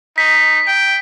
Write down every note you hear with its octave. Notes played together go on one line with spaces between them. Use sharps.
D#4 B6
G5